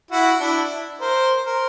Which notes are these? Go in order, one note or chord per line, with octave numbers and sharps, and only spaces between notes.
E4 F#4
D4 E4
A#4 C5
A#4 C5